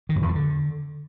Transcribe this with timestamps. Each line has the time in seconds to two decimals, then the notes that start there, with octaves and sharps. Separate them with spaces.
0.09 D#3
0.16 F#2
0.22 E2
0.29 F3
0.35 D3